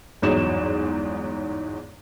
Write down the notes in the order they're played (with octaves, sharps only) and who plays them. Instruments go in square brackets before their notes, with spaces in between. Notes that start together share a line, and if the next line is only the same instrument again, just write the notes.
[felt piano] G1 E2 G#2 F#3 D#4 E7